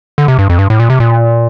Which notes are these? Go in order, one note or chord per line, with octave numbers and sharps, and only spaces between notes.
D3
C3
G2
F2
G2
A2
A#2
C3
A#2